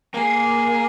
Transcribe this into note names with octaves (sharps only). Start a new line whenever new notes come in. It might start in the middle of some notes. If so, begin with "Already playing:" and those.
A#3 G#4